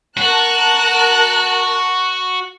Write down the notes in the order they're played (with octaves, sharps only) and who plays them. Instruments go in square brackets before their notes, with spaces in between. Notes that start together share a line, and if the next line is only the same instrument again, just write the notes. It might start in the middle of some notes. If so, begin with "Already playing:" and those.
[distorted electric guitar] F#4 [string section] A#4 A5 F#6